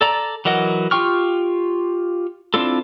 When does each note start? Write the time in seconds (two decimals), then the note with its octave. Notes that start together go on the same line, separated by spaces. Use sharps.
0.01 A4 D5 A#5
0.45 E3 F#3 A#4 D#5 F#5
0.91 F4 G4 G5 C#6 F6
2.54 C4 D4 E4 F4 A4